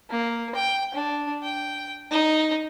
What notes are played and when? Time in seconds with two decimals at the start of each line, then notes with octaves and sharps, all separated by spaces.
0.10 A#3
0.55 G5
0.94 D4
1.43 G5
2.11 D#4